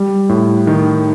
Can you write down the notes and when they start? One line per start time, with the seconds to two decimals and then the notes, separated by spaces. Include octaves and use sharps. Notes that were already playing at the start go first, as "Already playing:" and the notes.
Already playing: G3
0.29 A2
0.67 D#3